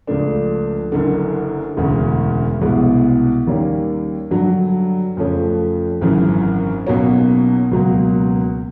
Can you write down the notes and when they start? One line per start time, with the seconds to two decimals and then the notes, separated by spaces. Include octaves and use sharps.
0.07 C#2 C#3 F3 A3 D4
0.92 F#1 F#2 D3
1.77 E1 D2 C#3
2.61 C2 B2 G#3 B3
3.47 D#2 D#3 G3 A#3 C#4
4.31 G2 D3 F#3
5.17 F2 C#3 F3 A3 C#4
6.01 G#1 F#2 C#3 E3
6.87 B1 B2 F#3 A#3 C#4
7.71 C#2 B2 F#3 A#3